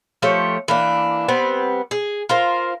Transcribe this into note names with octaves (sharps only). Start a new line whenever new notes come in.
F3 A3 G4 C#5
E3 A#3 D4
G3 B3 C4
G#4
F4 A#4 C5